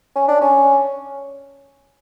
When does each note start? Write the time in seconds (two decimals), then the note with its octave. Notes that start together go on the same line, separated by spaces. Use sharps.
0.15 C#4
0.28 D4
0.41 C#4